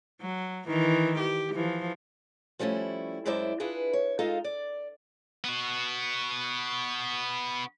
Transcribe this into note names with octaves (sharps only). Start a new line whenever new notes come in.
F#3
D#3 E3
G4
E3 F3
F3 G3 A3 C#4 E4
F#2 G#3 E4 C5 D5 E5
D4 E4 F4 G#4 B4
C#5
G#3 D#4 F4 A4 D#5 F5
D5
B3 F#4